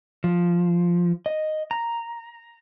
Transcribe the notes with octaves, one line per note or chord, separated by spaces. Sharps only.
F3
D#5
A#5